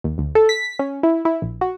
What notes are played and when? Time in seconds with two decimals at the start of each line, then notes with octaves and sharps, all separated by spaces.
0.04 D#2
0.18 D2
0.35 A4
0.49 B6
0.79 C#4
1.03 E4
1.25 E4
1.42 A#1
1.61 F#4